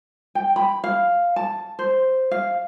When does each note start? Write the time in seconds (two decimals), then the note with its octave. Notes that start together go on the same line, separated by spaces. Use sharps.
0.35 G5
0.56 B5
0.84 F5
1.36 A5
1.79 C5
2.31 F5